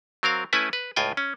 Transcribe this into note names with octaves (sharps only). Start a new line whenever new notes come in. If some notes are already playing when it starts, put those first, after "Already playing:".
F#3 C4 A#4 F5
A3 C#4 E4 B4 G#5
B4
C#2 A2 F4 G5 G#5
C#4